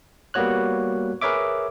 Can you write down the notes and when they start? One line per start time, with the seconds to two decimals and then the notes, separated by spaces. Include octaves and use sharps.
0.34 G3 A#3 B3 F#4 C#5 F#6
1.21 G#4 A#4 B4 C#5 E5 D6